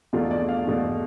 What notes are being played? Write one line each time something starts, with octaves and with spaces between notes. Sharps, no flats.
E2 B2 A3 D4 F4
D5
F5
E2 B2 A3 D4